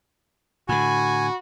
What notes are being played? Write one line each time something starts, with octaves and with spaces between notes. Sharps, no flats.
A2 D3 F#4 G#5 B5